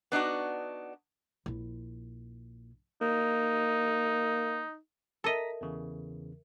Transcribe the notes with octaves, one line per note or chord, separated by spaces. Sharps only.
B3 D4 D#4 F#4
A#1 E4
A#3 D#4
A4 A#4 D#5 E5 A#5 A#6 B6
E2 C#3 E3